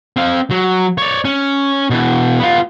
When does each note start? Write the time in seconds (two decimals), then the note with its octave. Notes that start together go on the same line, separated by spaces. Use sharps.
0.17 C4 F5
0.51 F#3
0.98 C#5 D5
1.25 C#4
1.90 B2 E3
2.40 B3 F4